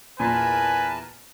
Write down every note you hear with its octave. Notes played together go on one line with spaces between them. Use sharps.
E2 A#2 A#4 B4 G#5 A5